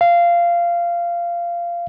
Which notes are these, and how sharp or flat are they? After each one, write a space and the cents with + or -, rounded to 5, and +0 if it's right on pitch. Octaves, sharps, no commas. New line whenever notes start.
F5 -15